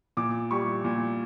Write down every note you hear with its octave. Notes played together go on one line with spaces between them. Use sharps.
A#2 D6
G3 C#6
A#2